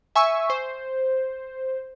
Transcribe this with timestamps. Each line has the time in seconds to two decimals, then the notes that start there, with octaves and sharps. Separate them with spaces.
0.15 E5 G#5 C#6 E6
0.50 C5